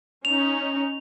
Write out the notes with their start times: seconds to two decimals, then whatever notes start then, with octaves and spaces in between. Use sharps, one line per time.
0.25 C#4 D#4 F7